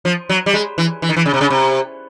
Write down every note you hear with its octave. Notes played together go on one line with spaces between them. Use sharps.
F3
F#3
G3
G#3
E3
E3
D#3
E3
C#3
C3
C#3
C3